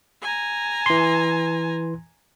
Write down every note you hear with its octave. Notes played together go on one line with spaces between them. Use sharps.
G#5 A#5
E3 C6